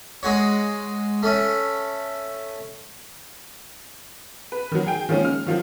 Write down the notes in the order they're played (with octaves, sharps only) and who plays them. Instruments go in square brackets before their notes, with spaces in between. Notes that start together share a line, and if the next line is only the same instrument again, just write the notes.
[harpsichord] G#3 F#4 C#5
A3 C#4
[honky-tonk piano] B4
D#3 F#3
G#4 G5
D#3 F3 G#3 A#3 C#4
F6
D#3 F3 F#3